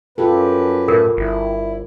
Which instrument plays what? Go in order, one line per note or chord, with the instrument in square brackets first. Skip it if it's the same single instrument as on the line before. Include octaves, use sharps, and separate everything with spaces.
[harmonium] F#2 B4 [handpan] F4 G4 A4
[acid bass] A2 [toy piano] A#4
[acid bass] G1 [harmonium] E4